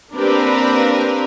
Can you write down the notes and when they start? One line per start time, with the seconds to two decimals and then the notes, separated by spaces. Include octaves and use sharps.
0.16 A#3 C4 D4 G4 A#4 B4